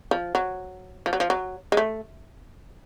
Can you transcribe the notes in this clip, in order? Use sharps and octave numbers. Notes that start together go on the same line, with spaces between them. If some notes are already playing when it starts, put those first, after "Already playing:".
F3
F#3
F3
F#3
F3
F#3
G#3
A3